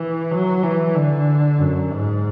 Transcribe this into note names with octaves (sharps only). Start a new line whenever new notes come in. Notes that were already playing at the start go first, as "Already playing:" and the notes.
Already playing: E3
F#3
E3
D3
F#2
G#2